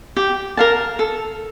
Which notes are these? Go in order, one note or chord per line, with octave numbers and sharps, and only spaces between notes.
G4
A#4 F5 A5
A4